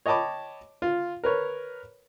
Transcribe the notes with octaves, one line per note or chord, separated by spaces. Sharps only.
C#5 D#5 G5 A5 B5 D6
F4
A#4 B4 C#5